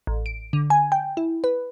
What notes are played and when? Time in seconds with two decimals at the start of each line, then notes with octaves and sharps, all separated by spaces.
0.07 A1
0.26 D7
0.53 D3
0.70 G#5
0.92 G5
1.17 E4
1.44 B4